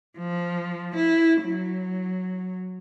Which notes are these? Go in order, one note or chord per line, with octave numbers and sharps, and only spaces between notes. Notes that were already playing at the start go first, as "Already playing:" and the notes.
F3
E4
F#3